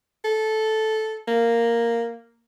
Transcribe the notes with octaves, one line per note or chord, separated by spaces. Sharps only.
A4
A#3